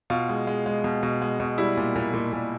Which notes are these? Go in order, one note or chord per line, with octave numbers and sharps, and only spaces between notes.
B2 F4
G#3
G#3
G#3
B2
B2
G#3
B2
G3 E4
A#2
A#2
A#2
A#2